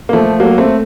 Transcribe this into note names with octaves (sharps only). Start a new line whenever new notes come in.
A#3
F3 A3
F#3 A#3
A3 C4